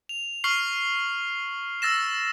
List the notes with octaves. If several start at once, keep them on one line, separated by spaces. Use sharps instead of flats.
F7
C#6 F6 C7 F#7
E6 A6 A#6 E7